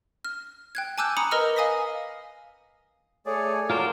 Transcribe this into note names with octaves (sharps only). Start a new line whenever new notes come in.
F6
G5 F#6 G#6
G#5 A5 D6 E6 F#6 G6
A#5 B5 D6 D#6 C#7 F#7
A#4 B4 D#5 A#5 E6 F6
F5 G#5 D#6 A#6 B6
A3 G#4 A4 C#5 D5 G#5
F3 F4 F#4 A#4 C5 D6